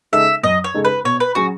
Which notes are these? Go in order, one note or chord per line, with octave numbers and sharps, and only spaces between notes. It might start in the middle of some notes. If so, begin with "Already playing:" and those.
C#3 G#3 D#4 A4 E5
F#2 D#5
C#5
C#3 G#3 D#4 A4
B4
B2 C#5
B4
F#3 C#4 F#4 G#4